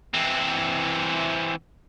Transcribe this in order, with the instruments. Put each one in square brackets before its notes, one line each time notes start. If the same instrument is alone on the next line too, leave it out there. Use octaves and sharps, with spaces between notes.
[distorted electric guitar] E3 C4